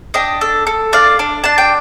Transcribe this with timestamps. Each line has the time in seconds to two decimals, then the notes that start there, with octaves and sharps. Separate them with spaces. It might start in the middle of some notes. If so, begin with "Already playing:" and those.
0.14 D4 D#5 G5
0.41 A4
0.67 A4
0.93 D4 D5 F5
1.19 D4
1.44 D4 A5
1.58 G5